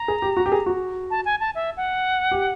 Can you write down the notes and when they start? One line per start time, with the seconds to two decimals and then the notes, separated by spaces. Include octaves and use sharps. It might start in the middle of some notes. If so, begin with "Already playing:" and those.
Already playing: A#5
0.08 G#4
0.22 G4
0.37 F#4
0.46 G4
0.52 G#4
0.66 F#4
1.10 A5
1.25 G#5
1.40 A5
1.55 E5
1.77 F#5
2.31 G4